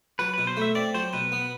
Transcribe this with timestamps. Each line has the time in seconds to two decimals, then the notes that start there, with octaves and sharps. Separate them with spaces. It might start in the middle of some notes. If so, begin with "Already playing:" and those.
0.19 F#3 B4
0.34 B2 B4
0.47 C5
0.57 A3 E5
0.75 C4 D5
0.94 F#3 C5
1.13 B2 B4
1.32 B3